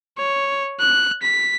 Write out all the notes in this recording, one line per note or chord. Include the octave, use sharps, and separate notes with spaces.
C#5
F#6
B6